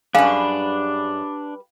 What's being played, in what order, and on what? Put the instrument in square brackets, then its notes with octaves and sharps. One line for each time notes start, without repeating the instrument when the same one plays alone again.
[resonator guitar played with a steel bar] F#2 G#4 [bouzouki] G3 B4 [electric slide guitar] D4 [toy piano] F5